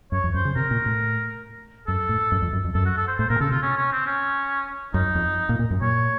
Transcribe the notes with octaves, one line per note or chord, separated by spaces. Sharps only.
F#2 C#5
F2
F#2 C5
C#3
C3 A#4
A#2
A2
F#2 A4
A2
F#2
F2
F#2
F2
F#2 A4
F#4
A4
C5
A2 C5
A#2 A#4
C#3 A4
C3 F4
C#4
C#4
C4
C#4
F#2 D#4
F2
A#2
A#2
F#2
A#2 C#5